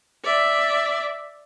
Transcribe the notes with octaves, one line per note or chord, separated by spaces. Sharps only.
D5 E5